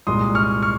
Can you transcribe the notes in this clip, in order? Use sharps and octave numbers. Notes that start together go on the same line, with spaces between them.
C2 A#2 G#3 C6 D#6
C#6 F6
C#6 F6